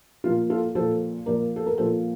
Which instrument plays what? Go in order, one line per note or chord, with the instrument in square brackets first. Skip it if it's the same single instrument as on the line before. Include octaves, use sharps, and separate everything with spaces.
[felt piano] A#2 F3 A#3 F4
F4 A4
A#2 F3 A#3 A4 C5
A#2 F3 A#3 A#4 D5
A4
A#4
A#2 F3 A#3 A4 C5